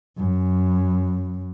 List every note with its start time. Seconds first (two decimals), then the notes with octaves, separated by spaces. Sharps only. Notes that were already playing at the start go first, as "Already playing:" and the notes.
0.17 F#2